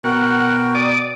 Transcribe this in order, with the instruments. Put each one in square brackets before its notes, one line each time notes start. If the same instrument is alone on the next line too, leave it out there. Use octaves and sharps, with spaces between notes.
[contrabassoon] B2 [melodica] F#4 A#4 G5 [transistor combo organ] F#5
[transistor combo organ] D5 D6 D#6